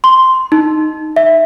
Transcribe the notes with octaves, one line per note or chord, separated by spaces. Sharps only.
C6
D#4
E5